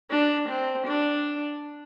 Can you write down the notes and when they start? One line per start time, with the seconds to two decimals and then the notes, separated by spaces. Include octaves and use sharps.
0.10 D4
0.49 C4
0.87 D4